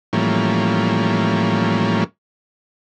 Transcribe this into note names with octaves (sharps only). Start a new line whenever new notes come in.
A2 E3 F3 G3 A#3 C#4